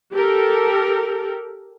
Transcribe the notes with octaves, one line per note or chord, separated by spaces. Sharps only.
G4 A4 A#4